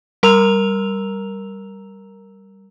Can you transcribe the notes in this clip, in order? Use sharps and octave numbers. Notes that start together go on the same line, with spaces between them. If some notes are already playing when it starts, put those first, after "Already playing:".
G3 A#4 A#5 E6 F7